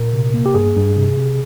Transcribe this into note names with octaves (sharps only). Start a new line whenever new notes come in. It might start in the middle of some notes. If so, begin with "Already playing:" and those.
Already playing: A#2 A#4
C3
A#3
G4
G2 G#4
G2
C3
C3